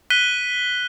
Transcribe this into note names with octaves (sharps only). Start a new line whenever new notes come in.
F#6 B6 D#7 G7